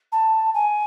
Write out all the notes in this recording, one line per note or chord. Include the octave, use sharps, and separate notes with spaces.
A5
G#5